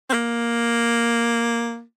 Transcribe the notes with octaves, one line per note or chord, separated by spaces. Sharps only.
C4
A#3